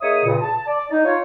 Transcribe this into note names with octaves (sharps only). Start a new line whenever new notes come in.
A#3 D#4 G#4 C#5 E5 D#6
G2 A#2 C#3
A5
D5
D#4
F4 C#5